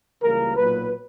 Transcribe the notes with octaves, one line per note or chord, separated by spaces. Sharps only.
C#2 C#3 E3 G3 A#3 A#4
B1 A#2 F#3 A#3 B4